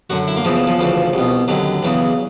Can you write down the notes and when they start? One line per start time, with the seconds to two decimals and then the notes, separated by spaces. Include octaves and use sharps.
0.10 F#2 D3 F#4
0.28 E4
0.37 A#3
0.45 E2 C#3 E3 F3
0.56 E3
0.67 F3
0.79 D2 C#3 E3
1.13 C2 B2
1.48 D#2 D3 F#3
1.83 E2 C#3 E3